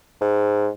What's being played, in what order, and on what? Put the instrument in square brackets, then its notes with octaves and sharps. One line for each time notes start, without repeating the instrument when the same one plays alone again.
[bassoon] G#2